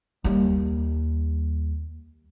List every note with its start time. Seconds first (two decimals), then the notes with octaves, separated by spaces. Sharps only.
0.24 D#2 G3